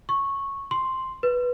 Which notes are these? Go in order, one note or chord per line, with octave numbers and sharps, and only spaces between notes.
C#6
C6
B4